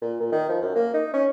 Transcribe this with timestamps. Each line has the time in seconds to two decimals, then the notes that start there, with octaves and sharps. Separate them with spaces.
0.02 A#2
0.20 A#2
0.32 D#3
0.49 F3
0.61 F#2
0.76 A#3
0.94 D#4
1.14 C#4